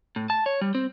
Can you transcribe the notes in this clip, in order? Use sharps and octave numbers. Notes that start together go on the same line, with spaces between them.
A2
A5
C#5
G3
C4